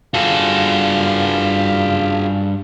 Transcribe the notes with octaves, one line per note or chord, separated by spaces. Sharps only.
G2 F4 F#4 G#4 A4